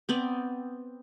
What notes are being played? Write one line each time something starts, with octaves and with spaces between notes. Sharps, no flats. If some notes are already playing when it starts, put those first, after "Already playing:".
B3 C4 D5